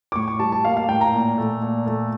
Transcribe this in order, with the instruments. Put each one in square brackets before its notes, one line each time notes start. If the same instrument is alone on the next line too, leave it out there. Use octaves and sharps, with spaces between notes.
[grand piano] D6
A2 C#6
C#6
G3 A5
A5
A#3 F5
F5
A2 G5
A#5
A#2
A3
A#2
A3